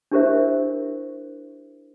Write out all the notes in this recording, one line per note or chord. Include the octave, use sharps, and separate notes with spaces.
D4 E4 G4 A#4 C5 E5